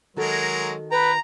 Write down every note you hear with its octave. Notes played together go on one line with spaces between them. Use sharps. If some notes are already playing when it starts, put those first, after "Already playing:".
D#3 F#3 G#3 F#4 A4 A#4
B4 G5 A#5